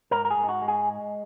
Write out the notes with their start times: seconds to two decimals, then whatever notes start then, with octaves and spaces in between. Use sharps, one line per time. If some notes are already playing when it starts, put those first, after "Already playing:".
0.11 G#2 A#4
0.25 A#4
0.31 G#4
0.37 G#2
0.44 D#4
0.49 F#4
0.62 G#3
0.68 G#4